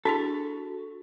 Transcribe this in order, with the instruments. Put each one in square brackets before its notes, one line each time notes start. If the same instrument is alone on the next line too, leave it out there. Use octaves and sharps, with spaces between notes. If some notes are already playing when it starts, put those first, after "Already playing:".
[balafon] D4 E4 G#4 [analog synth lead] F#4 [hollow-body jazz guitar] A4